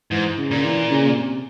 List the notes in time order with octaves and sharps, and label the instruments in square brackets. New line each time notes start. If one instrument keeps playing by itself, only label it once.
[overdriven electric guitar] G#2 [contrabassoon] E3
[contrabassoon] C#3
[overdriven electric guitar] A#2 [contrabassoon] C#3
[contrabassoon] E3
C#3
C3